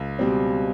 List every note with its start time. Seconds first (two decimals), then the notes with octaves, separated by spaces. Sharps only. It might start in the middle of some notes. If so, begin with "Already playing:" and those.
Already playing: C#2
0.19 B2 G3 C4